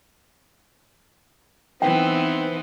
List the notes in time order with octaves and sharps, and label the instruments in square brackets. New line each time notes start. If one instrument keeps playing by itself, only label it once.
[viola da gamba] E3 D#4 [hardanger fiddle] B3 [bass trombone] C4 [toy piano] G5